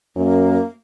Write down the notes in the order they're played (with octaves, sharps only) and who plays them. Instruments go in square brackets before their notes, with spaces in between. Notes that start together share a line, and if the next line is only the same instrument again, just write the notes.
[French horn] F#2 [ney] A#3